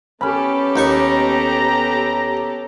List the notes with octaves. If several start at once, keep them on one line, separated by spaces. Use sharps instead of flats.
B3 C#4 G4 A4 B5
D#2 D#4 A#5 C#6